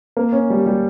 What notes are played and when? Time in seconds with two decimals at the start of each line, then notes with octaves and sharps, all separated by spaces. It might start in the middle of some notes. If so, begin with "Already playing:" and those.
0.17 A#3
0.33 C#4
0.50 G3
0.66 G3